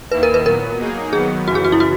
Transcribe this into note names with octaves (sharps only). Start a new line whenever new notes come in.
D#2 D#3 A#3 E4 B4
A#4
B4
A#2 F#3 B3 A#4
F#3 A#3 D#4 G#4
D#3 F#3 B3 G#4
F#2 C#3 E3 F#4
G#4
F#4
E4
F#4